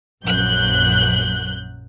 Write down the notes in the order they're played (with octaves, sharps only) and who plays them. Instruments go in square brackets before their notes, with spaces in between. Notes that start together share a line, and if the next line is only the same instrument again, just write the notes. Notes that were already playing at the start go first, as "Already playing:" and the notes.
[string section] A#1 F#2 F#3 F#6 G6